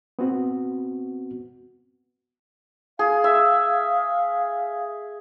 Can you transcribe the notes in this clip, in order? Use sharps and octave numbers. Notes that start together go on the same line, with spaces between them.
B3 C4 F#4
G#4 F5
E5